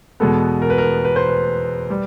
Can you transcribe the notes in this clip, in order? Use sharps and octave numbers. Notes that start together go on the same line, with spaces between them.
E2 B2 G#3 B3 A4
A#4
B4
A#4
B4
C5
B4
G3